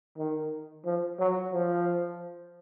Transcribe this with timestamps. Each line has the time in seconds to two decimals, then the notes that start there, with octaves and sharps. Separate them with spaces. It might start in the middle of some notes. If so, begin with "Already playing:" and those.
0.18 D#3
0.86 F3
1.19 F#3
1.53 F3